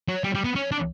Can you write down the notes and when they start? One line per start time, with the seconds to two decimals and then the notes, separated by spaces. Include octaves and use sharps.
0.08 F#3
0.24 G3
0.35 G3
0.44 B3
0.55 C#4
0.71 D4